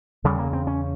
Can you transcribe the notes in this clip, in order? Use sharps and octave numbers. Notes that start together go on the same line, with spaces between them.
E2 C#3 G3
A#3
C4
C#4